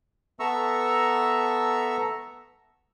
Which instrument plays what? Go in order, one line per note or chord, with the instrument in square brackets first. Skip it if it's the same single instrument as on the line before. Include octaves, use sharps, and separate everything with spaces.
[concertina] B3 A4 E5 A#5 C#6 E6